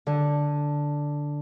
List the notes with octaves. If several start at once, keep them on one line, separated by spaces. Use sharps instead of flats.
D3